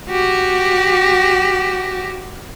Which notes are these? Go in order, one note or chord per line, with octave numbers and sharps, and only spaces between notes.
F#4 G4